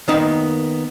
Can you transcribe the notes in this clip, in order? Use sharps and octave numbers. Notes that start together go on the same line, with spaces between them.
D#3 A#3 B3 D#4 E5